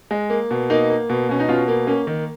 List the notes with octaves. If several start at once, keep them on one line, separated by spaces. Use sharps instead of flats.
G#3
A#3
B2
A#3 D#4
A#3
B2
B2 C#4
D#4
B2 C#4 F4
A#3
A#3 C#4
D#3